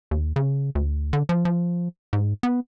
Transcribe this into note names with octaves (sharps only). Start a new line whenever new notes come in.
D#2
C#3
D2
D3
F3
F3
G#2
B3